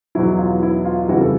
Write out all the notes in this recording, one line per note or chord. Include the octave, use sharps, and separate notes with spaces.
E2 B2 F#3 E4
F4
E4
F4
F2 C#3 E3 G3 E4 F#4
A4